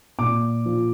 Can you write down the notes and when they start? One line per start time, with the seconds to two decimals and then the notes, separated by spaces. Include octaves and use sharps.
0.19 A#2 D6
0.66 F3